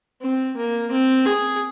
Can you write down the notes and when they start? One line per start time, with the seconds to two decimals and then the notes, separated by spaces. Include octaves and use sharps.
0.21 C4
0.57 A#3
0.91 C4
1.26 G#4